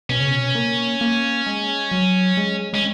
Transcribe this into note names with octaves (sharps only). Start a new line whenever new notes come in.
B2 C#4
C#3
B2
A#3
A#3
G#3
F#3
G#3
G#3 C#4